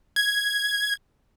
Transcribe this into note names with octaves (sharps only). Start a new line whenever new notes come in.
G#6